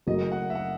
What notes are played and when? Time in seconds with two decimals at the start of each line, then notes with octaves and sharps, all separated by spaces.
0.07 F#1 F#2 C#3 F#3 A3 D#5
0.32 F#5
0.50 E5
0.55 F#5